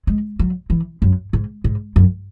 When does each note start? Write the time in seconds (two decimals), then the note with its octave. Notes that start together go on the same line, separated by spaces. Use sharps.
0.07 G#3
0.39 F#3
0.70 E3
1.02 F#2
1.33 G#2
1.64 G#2
1.96 F#2